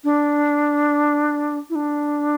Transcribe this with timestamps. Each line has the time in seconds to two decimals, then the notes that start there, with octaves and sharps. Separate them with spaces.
0.04 D4
1.70 E4
1.75 D4